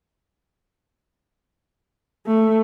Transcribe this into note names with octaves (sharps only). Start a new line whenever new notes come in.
A3